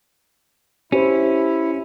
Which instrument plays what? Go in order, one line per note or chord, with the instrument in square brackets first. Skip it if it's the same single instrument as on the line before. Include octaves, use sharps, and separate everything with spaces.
[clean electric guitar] C#4 [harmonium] E4 [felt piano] G4 C5